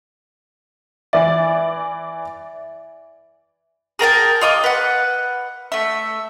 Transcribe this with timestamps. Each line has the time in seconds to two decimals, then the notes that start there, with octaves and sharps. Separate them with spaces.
1.13 E3 D5 E5
3.99 G#4 A#4 G5 A5
4.41 F4 D#5 C#6 D6
4.64 B4 F#5
5.72 A3 E5